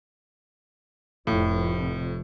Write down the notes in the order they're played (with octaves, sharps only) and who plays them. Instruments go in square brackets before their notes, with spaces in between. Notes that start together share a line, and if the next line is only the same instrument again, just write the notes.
[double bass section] F1 F2 F3 [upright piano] A2